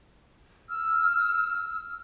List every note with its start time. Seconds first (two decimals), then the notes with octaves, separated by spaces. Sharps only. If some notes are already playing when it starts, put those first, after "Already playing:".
0.68 E6 F6